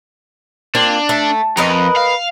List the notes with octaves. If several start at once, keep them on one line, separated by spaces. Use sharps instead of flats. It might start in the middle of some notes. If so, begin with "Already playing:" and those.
A#3 C4 D4 F4
A3
F2 A#4 B4 D#5
F5